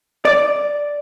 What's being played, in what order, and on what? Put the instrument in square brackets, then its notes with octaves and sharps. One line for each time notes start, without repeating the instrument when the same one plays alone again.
[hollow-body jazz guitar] D5